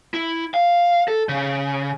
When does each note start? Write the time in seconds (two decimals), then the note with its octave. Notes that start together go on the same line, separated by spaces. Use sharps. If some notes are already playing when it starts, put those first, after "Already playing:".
0.14 E4
0.54 F5
1.08 A4
1.29 C#3